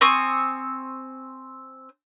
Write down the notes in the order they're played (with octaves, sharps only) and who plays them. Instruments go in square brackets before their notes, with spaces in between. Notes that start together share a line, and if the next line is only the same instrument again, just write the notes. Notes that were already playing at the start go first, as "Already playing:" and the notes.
[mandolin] C4 G#5 C#6 D#6